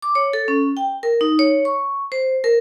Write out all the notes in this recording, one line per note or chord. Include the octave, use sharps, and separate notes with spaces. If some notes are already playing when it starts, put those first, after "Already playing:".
D6
C#5
A4
C#4
G5
A#4
D#4
C#5
C#6
C5
A#4